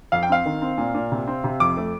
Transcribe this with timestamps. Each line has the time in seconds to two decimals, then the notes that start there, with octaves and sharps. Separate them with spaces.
0.12 F2 F5
0.23 G5
0.29 C4 F5
0.45 D#3
0.62 C4
0.78 A#2
0.95 A#2
1.12 C3
1.28 C4
1.44 C3
1.60 F2 D6
1.77 A3